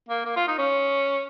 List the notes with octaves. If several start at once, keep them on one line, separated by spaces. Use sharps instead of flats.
A#3
A#3
F4
D#4
C#4